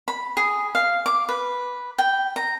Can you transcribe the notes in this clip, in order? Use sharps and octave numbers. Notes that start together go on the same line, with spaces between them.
B5
G#4
F5
D6
B4
G5
A#5